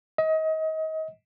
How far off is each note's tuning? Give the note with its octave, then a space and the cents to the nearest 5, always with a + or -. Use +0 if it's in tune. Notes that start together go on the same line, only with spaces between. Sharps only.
D#5 +30